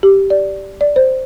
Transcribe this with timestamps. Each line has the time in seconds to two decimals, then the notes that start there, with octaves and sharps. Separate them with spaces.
0.03 G4
0.30 D5
0.81 D5
0.96 C5